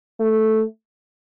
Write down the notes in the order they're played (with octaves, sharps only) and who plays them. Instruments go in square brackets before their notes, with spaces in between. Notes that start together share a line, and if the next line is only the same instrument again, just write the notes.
[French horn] A3